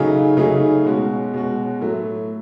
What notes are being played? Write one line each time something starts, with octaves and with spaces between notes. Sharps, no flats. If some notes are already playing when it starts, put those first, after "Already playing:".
Already playing: C#3 F#3 A3 D#4 G#4
C#3 F#3 A3 D#4 G#4
B2 G#3 C#4 F#4
B2 G#3 C#4 F#4
A2 F#3 A3